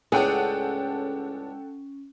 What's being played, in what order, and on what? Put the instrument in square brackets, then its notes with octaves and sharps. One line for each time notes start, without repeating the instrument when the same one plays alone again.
[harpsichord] C#2 A2 D4 [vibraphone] C#4 [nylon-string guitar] G#4 [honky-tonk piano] A4 F#5 G5